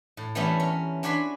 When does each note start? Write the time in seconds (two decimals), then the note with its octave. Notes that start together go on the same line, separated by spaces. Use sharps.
0.17 A2
0.35 E3 G3 A3 B3 C#4 E4
0.60 C#4 A#4
1.03 D4 F#4 C#5 G#5 B5 C6